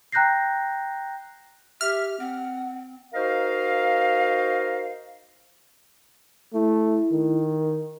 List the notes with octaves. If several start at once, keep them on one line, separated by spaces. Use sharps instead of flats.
G5 A#5 F#6 G6 A#6 C7
G4 E5 F6
C4 F#5
D#4 F#4 A#4 C5 D#5 F5
A3 E4
D#3